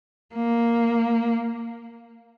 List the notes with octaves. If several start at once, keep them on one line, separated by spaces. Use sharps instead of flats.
A#3